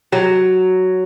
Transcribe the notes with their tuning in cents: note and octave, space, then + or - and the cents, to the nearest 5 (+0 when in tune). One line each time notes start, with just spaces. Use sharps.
F#3 +5